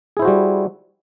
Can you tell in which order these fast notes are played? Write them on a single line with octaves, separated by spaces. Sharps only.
G#4 E4 C5 F#4 G3